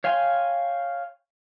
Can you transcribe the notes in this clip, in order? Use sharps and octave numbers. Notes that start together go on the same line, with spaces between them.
C#5 F5 G5 G#5 C6